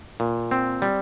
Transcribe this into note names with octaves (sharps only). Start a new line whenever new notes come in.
A#2
C4
G3